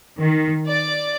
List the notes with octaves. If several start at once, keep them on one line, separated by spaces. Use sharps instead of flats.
D#3
D5